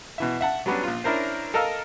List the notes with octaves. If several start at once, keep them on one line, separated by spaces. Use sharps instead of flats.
B2 E3 E5
E5 F#5 A5
F#3 G3 B3 C#4 D4
A#1 F4
C#4 D4 E4 A#4 C5
A4 A#4 D#5 F5 E6